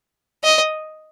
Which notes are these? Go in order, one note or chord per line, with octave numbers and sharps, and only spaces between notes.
D#5